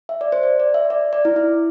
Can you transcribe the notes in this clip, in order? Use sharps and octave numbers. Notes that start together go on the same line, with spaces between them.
E5
D5
C5
D5
D5
E5
D5
D5
E4
E4